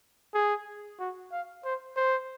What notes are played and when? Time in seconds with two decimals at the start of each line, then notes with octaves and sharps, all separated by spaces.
0.35 G#4
1.00 F#4
1.32 F5
1.64 C5
1.97 C5